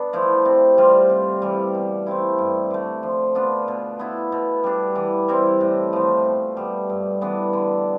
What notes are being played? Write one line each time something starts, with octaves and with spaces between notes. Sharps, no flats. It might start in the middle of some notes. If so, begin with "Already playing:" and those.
Already playing: B3 D4
F3 A3 E4
C3
G3 C4 F4
C3
E3 G3
B2
A3 C4 E4
G2
D3 A3
F3
B3 D4 F4
B2
B3 E4
B2
G3 D4
E3
G3 C4 E4
A2
F3 A3
B2
G3 B3
G2
E3 B3 D4
D3